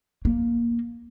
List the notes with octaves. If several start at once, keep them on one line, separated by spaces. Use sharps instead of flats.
A#3